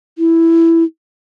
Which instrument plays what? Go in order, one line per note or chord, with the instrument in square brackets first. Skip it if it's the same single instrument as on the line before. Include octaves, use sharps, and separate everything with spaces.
[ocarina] E4